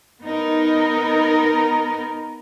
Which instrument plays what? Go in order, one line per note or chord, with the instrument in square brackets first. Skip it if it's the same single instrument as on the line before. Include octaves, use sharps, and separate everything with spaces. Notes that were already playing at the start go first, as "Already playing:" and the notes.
[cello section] B3 D#4 A#4